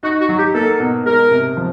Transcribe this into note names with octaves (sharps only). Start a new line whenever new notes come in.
D#4 F#4
F#4
F#3
G4
A#3 A4
B2
G#3 A#4
C3
F3